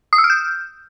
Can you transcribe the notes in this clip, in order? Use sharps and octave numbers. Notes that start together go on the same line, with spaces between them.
D#6
E6
F6
G6